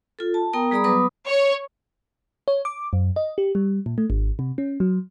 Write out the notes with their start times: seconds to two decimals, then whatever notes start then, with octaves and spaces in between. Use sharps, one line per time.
0.19 F4 A4
0.34 A5
0.53 B3 A#4 G5 A#5 D#6
0.71 G3 G#4 D5 A#5 B5 D#6
0.84 F#3 B3 B4 B5 D6 D#6
1.26 C#5
2.48 C#5
2.65 D6
2.93 F#2
3.16 D#5
3.38 G4
3.55 G3
3.86 A#2
3.98 A3
4.10 G#1
4.39 C3
4.58 C#4
4.80 F#3